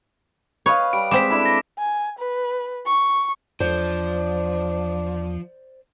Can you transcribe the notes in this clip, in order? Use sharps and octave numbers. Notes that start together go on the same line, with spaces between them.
B4 C#5 D#5 F5
G3 D7
G#3 C4 D6 B6
D4 E4 A4
A#6
G#5
B4
C#6
E2 F3 D4 C5 D5